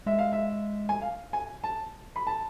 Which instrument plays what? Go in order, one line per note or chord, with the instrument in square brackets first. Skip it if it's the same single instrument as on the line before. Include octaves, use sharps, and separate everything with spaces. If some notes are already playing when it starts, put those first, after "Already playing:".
[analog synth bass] G#3 [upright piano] E5
[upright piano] F5
E5
G#5
F5
G#5
A5
B5
A5